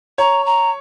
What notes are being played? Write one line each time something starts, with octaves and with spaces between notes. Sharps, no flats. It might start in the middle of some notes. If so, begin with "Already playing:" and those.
C#5 A#5
A#5